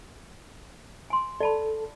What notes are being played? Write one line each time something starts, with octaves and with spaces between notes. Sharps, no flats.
G#5 C6
A4 D5 A5 B5